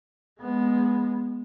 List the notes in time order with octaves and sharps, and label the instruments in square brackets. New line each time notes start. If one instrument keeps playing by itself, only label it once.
[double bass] G#3 B3